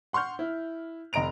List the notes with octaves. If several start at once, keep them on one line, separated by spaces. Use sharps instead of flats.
F#5 C6 C#6 F6 G6
E4
F1 D#5 A#5 D7 F7